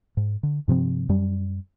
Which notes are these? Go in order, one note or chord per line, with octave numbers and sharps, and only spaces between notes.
G#2
D3
G2 C3 F3 C4
F#2 G3